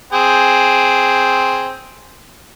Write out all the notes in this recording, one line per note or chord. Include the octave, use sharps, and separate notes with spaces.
C4 G#4